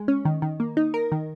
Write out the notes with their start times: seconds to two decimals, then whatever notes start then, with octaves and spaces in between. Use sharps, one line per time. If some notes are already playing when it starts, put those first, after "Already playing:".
Already playing: G#3
0.08 C#4
0.25 D#3
0.42 D#3
0.60 A#3
0.77 D#4
0.94 A#4
1.12 D#3